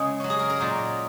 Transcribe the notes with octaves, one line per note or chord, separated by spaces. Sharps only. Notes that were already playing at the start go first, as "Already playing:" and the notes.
Already playing: C#3 G#3 G#4
F#3 C#4
G#4
A#4
A#4
A#2 F#3 D#4